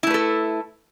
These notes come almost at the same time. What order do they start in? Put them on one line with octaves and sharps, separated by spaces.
E4 A3 B4 A4